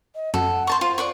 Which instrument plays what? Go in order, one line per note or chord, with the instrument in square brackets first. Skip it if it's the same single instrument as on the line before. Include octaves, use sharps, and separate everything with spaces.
[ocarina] D#5
[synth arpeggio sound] F#2 [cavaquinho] A4 [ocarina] F#5
[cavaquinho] C5 A5 C#6
[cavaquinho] F4 [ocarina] C5
[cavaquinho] D5 F#5 C#6